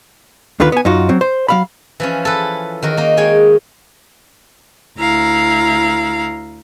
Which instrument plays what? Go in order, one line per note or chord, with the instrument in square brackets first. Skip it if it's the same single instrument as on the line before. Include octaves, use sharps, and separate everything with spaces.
[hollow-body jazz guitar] D2 D3 D#3 F4 B4
B3 G#5
F#2 D#4 F4 F#4
F#3 C4
C5
F#3 F5 B5
[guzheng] E3 F3 C#4
A4 B4
D#3 F#4 A#4
A#3 D#4
G#3 C#5 G5 G#5
[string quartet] D2 E4 F5 A#5